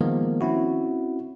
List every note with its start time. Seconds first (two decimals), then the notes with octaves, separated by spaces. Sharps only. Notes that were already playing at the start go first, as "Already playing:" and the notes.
0.01 D#3 F3 G#3 A#3 B3
0.41 C4 C#4 E4 F#4